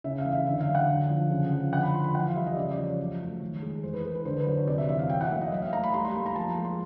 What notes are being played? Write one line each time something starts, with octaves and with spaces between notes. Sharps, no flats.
C#3 E5
F5
E3
E5
D3 E5
F5
F#3
F#5
D3
F3
C#3
F3
D3 F#5
B5
F3 C6
B5
E3 F#5
F5
G3 E5
D#5
C#3 D5
D5
F3
C#5
F#3
A3
D#3
G#3
E3 C5
B4
G#3 A#4
B4
D3 C5
B4
F#3 C5
C#5
C3 D5
E5
E3 E5
F5
F#3 G5
F#5
A#3 E5
D#5
F#3 E5
F5
A3 A#5
B5
G3 C6
C6
A#3 B5
A#5
F3 A5
G#3
C6